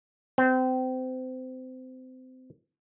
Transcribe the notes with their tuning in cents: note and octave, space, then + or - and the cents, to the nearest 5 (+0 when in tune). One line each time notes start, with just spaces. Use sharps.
C4 -30